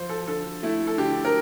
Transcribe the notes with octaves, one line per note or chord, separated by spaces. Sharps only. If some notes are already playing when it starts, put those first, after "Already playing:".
Already playing: F3 C5
A4
D3 A4
A3 E4
A4
D3 G4
A#4